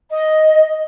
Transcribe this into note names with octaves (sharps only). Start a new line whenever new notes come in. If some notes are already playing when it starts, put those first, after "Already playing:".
D#5